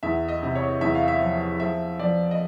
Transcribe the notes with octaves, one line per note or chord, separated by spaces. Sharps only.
E2 E5
D#5
C3
C#5
E2 E5
F5
E5
F3
F3 E5
F3 D5
D#5